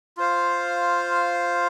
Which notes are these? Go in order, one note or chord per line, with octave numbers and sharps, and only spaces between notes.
F4 C5 F5